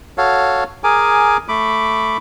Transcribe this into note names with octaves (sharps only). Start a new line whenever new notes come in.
F#4 A4 C#5 F5
G#4 A#4 G#5 D6
A3 B5 D6